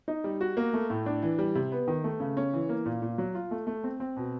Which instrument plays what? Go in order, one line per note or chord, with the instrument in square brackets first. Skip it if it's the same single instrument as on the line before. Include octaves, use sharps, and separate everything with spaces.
[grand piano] D#4
G3
F#4
A#3
A3
A2
D4
E3
G3
C3
B3
D#3
A3
C#3
C#4
E3
A#3
A#2
A#2
F#3
F4
A3
A3
C4
C4
B2